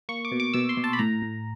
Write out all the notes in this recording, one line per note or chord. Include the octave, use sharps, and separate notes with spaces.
A#3 C#6
D6
B2
D6
B2 E6
C6
B2
A5
B5
A2 A#5
A2